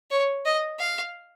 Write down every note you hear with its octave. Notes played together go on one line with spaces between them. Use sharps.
C#5
D#5
F5